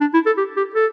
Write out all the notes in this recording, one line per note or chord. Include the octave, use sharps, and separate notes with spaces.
D4
E4
A4
G4
G4
A4